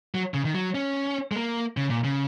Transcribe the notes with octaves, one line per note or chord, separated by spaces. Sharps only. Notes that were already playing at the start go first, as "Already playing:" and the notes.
F#3
C#3
D#3
F#3
C#4
G#3
A#3
C#3
A#2
C#3